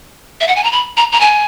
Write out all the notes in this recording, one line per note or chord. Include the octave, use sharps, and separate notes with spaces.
E5
F#5
G#5
A#5
B5
A#5
A#5
G#5